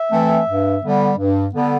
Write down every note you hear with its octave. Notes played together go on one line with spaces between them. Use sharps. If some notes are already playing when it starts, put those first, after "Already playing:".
Already playing: E5
E3 A3 C4
G2
D3 G3 B3
G2
D3 G3 B3